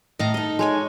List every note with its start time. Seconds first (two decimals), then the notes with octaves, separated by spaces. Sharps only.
0.19 A2 D#5 F5 A#5
0.34 D#4 A4 D#5
0.59 G#3 C#5 G#5